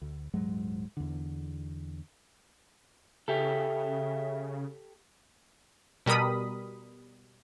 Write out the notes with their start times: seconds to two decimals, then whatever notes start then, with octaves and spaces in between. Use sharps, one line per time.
0.02 D2
0.34 D#1 G#2 F#3 G#3
0.97 E2 D3
3.28 C#3 G4 A4 E5
6.06 B2 G3 A#4 B5 D#6